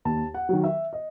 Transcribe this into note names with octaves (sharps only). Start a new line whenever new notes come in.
D#2 A5
F#5
D#3 F#3
E5
D#5